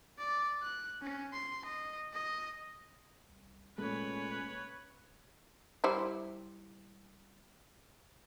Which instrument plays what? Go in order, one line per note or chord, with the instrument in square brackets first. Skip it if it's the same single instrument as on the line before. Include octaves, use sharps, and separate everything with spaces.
[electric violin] D5
F#6
C#4
C6
D#5
D#5
[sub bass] C2
[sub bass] F1 [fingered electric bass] A#2 G#3 A3 [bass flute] C#4 [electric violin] B4 C#5
[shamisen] G3 E4 C5